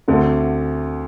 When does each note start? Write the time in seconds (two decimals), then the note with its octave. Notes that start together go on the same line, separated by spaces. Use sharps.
0.08 D2 D3 A3 C4